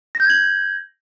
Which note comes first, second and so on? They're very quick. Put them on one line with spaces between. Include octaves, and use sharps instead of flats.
A#6 G6 G#6 F#7